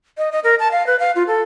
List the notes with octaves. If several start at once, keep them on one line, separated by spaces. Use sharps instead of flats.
D#5
D#5
A#4
A5
F5
B4
F5
F4
A4